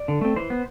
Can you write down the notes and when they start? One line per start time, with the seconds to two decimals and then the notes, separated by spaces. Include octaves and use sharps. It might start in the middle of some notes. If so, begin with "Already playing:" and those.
Already playing: D5
0.08 D3
0.21 A3 C4
0.36 E3 C5
0.50 B3